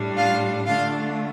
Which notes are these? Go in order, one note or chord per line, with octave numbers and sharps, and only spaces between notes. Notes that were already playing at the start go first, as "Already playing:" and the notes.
Already playing: A2 G3 D4
F4 F5
D3 A3 D4 F4 F5